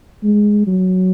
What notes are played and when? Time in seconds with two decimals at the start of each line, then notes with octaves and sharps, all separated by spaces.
0.23 G#3
0.67 F#3